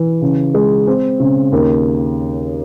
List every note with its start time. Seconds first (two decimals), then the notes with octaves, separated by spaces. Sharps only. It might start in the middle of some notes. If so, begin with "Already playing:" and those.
Already playing: E3
0.21 C#3
0.54 G#3
0.87 C4
1.19 C#3
1.52 D#2